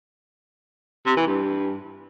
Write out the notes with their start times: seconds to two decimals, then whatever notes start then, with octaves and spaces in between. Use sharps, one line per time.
1.06 C3
1.17 E3
1.27 G2